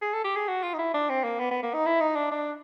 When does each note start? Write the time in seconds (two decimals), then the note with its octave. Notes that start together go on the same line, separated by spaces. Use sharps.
0.02 G#4
0.14 A4
0.24 G4
0.36 G#4
0.48 F#4
0.63 F4
0.74 D#4
0.78 E4
0.94 D4
1.09 C4
1.24 A#3
1.39 B3
1.51 B3
1.63 A#3
1.74 D#4
1.86 E4
2.01 D#4
2.16 D4
2.31 D4